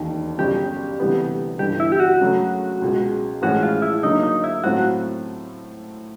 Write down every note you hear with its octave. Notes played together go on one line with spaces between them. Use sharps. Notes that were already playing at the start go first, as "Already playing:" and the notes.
Already playing: E1 D#2 D#3
G1 F#2 C#3 G4
D2 C3 E3 G3 B3
G1 G2 E3 G3 G4
E4
G4
F#4
F#2 C#3 F#3 A3
C#2 B2 G#3
A1 A2 F3 G#3 C#4 F#4
F4
E4
D3 F#3 A#3 D#4
D#4
E4
A2 F#3 A3 C4 F4 F#4